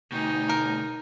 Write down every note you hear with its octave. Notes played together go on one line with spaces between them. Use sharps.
D2 B2 D#4 G5 G#5
A#4